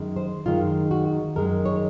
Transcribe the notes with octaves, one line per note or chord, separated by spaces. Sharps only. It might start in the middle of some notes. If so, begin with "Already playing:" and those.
Already playing: F#2 D#3 G#3
C5
F#2 D#3 G#3 F4
F#4
F#2 D#3 G#3 A#4
C#5